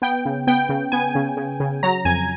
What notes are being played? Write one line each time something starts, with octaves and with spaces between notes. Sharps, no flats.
B3 G5
C#3
B3 G5
C#3
B3 G#5
C#3
C#3
C#3
F#3 A#5
F2 G#5